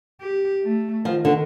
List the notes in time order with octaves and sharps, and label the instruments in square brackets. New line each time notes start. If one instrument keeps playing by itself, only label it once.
[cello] G4
A3
[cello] D#3 [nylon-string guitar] F3
[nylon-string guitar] D3